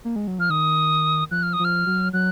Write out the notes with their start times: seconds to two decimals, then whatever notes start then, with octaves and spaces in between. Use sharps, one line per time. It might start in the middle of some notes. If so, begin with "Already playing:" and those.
0.05 A#3
0.16 G#3
0.27 F#3
0.39 F3 F6
0.50 D#3 D#6
1.31 F3 F#6
1.43 F6
1.53 D#6
1.59 F3
1.65 F6
1.86 F#3
2.13 F#3 F#6